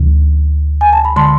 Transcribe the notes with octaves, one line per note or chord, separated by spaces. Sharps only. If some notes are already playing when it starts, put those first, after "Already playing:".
Already playing: D2 C3 E3
G#5
A5
B5
D3 G#3 A5 C6